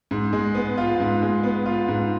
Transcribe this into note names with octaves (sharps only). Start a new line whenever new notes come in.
G#2
G#3
B3
F4
G#2
G#3
B3
F4
G#2